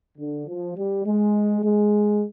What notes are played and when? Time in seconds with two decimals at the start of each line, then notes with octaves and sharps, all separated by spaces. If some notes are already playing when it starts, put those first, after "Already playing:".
0.18 D3
0.47 F3
0.75 G3
1.04 G#3
1.62 G#3